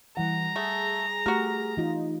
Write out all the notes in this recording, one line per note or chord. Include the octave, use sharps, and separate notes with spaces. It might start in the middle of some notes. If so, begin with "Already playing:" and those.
E3 G3 F#5 A#5
A3 G#4
A3 F#4 G4 A#4
E3 D#4 F4